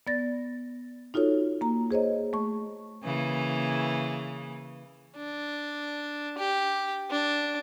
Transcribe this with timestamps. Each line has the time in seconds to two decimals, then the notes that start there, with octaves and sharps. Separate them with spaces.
0.07 B3 D5 A6 A#6
1.14 D#4 F4 F#4 A4 C#5
1.61 A#3 A#5
1.91 G#4 C5 C#5 D#5
2.33 A3 C#6
3.03 C#3 E3 A#3
5.17 D4
6.38 G4
7.10 D4